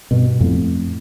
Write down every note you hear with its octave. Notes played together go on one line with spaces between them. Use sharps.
G2 B2
F2 A2